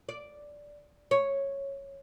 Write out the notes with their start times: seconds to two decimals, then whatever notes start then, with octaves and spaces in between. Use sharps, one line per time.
0.09 D5
1.11 C#5